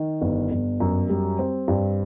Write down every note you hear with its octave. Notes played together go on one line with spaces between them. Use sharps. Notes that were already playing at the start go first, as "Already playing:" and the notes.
Already playing: D#3
G1
G1
F#2
G3
C4
G2